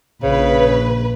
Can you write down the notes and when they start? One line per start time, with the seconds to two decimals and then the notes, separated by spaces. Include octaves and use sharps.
0.23 A#1 C#3 B4